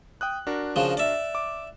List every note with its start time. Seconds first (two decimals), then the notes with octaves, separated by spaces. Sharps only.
0.21 G5 D#6 F#6
0.47 D4 F#4 A#4
0.76 C#3 F3
0.97 D5 E5
1.35 D6